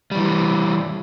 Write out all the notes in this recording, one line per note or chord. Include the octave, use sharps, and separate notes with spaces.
E3 G3